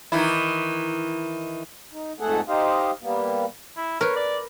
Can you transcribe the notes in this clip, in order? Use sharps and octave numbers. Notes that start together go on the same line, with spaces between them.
D#3 E3 E4
D#4
F2 G#2 A3 G#4 A4 F#5
D#4 G4 C5 D#5 F5
G3 A#3 B3
E4
A#4 B4 C#5
D5